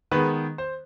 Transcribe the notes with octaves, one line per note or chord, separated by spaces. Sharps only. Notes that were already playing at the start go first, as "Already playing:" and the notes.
D#3 G#3 B3 B4
C5